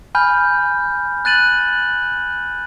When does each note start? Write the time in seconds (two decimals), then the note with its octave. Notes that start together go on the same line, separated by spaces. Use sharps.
0.15 G#5 B5 F6 G6
1.25 F#6 A6 D#7 F#7